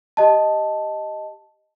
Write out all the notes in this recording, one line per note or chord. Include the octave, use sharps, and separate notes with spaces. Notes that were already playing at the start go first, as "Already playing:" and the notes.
G4 D#5 A5